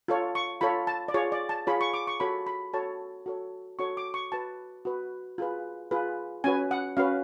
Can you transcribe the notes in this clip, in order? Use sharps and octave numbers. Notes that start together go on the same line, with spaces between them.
F4 A4 C#5
C#6
F4 A4 C#5 B5
A5
D5
F4 G#4 C#5
D5
A5
F4 G#4 C#5 B5
C#6
D6
C#6
F#4 A4 C#5 B5
B5
F#4 A4 C#5 A5
F#4 A4 C#5
F#4 A4 C#5 C#6
D6
C#6
F#4 B4 A5
F#4 B4
F4 G#4 B4
F4 G#4 B4
C#4 F#4 B4 G#5
F#5
C#4 F#4 B4 F5